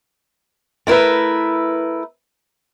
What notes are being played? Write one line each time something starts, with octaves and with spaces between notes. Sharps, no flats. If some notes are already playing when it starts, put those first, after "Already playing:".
A3 E4 A#4 B4 E5